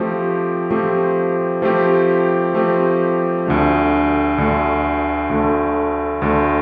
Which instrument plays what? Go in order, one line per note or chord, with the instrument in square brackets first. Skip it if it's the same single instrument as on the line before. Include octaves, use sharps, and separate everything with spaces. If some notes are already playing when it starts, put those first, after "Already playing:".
Already playing: [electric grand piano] F3 A3 C4 G4
F3 A3 C4 G4
F3 A3 C4 G4
F3 A3 C4 G4
D2 D3 A3
D2 D3 A3
D2 D3 A3
D2 D3 A3